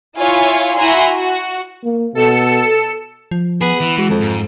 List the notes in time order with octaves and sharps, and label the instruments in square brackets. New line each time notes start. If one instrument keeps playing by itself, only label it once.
[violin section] E4 F4 C#5 F5 G#5
E4 F#4 G#5 A#5 C6
F#4
[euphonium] A#3
[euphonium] B2 [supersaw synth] A4 C#7 E7
[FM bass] F3
[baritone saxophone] B3 [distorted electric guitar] G#4
[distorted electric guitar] E3
[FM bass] G#3 [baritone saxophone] F#4
[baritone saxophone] F2
[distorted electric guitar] G#2